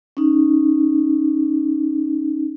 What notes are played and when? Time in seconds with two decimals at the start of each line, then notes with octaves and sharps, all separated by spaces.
0.17 C#4 D#4